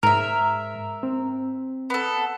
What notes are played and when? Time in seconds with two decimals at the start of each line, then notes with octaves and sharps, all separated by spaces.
0.03 G#2 A#4 E5 A#5 F6
1.03 C4
1.90 B3 A4